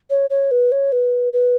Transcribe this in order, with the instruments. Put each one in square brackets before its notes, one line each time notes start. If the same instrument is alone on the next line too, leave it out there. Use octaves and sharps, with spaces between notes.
[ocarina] C#5
C#5
B4
C#5
B4
B4